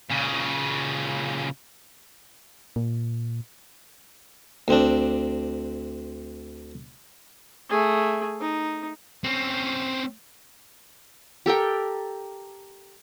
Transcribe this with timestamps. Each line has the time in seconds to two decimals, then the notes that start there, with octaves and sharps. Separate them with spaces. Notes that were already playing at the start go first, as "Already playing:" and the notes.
0.10 A#2 C#3
2.76 A#2
4.68 D2 C4 D4
7.70 A3 G#4
8.41 D#4
9.24 C4 C#4
11.46 G4 A4 A#4 G5